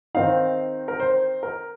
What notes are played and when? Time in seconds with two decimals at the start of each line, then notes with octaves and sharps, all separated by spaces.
0.15 D#3 C4 D#4 F5
0.88 A#4
1.00 C5
1.43 A#4